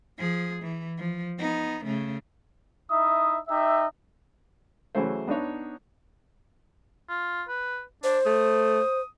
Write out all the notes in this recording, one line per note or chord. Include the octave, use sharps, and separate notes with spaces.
F3 G#4
E3
F3
B3 D#4
C#3 A3
D#4 E4 E5 D#6
D#4 G4 E5
C#3 E3 F#3 A3 C5
B3 D4 D#4 C#5
F4
B4
D4 C5
A3 D#6